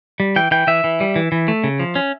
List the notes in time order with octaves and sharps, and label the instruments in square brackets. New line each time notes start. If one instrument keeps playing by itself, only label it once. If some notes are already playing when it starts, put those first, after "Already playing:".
[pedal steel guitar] G3
E3 G5
E3 G5
E3 E5
E3
G3
E3
E3
A3
C#3
F3
C#4